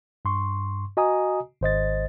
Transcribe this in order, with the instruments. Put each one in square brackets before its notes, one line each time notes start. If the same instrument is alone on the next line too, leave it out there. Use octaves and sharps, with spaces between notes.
[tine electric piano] G2 C6 C#6
F#4 D#5 G#5 A#5 D#6
G#1 C5 D#5 A6